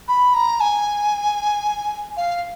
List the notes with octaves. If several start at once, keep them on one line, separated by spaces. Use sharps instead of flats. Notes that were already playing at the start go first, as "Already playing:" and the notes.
B5
A#5
G#5
F5